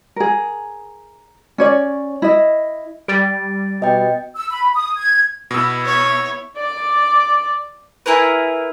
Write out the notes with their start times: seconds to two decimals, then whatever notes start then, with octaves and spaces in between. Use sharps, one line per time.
0.16 G#4 A#4
1.58 C#4 C#5 D5
2.22 E4 D#5
3.08 G3 A6 D7
3.82 B2 D#5 G5
4.36 E6
4.50 B5
4.74 D#6
4.97 G#6
5.51 B2 B3 E4 E6
5.85 C#5
6.56 D5 D6
8.06 E4 G#4 A#4 B4